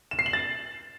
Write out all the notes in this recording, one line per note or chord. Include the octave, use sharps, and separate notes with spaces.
E7
C7
F#7
A6